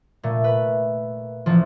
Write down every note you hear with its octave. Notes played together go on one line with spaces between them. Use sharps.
A#2 A3
B4
A1 F3